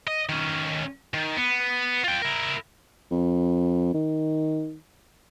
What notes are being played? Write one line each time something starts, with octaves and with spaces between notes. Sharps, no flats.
D#5
D#3 C#4
D#3
B3
F4 G5
E4 A#4
F2
D#3